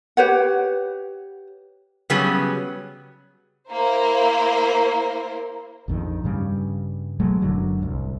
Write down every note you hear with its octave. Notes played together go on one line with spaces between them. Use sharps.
G4 B4 C#5 F#5
C#3 F#3 G3 B3 C#4 G#4
A#3 E4 A#4 C5
A#1 F2 D#3
G2 C#3 G3
B2 F#3 G#3 A3
F#1 F#2 D3 F#3
D1 C2